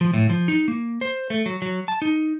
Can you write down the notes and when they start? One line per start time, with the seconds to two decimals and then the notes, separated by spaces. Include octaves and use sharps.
0.01 F3
0.14 A2
0.30 F3
0.48 D#4
0.68 A#3
1.01 C5
1.30 A3
1.46 F#3
1.62 F#3
1.88 A5
2.02 D#4